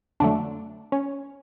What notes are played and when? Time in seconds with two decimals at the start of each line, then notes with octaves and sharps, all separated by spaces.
0.20 F2 D3 F#3 A3 D4
0.92 C#4